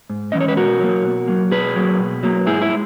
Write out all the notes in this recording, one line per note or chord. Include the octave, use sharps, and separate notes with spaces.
G#2
E3 G#3 C#4 D#5
C#5
B4
B2 F#4 A#4
F#3 A#3
B2
F#3 A#3
B2 G#4 B4
F#3 A#3
B2
F#3 A#3
G#2 E4 G#4
E4
G#3